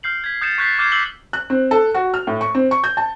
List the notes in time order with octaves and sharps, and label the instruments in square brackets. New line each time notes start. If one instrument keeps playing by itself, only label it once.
[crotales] F6 G6 C7 F#7
G#6 B6
D#6 G6 A6 C#7 E7
C#6 F#6 G6 A6 B6 C7
D6 F6 G6 G#6 C7 E7
D6 E6 G6 C7 F#7 G7
[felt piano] F#6
C4
A4
F#4
F6
A2
C#6
C4
C#6
G6
A5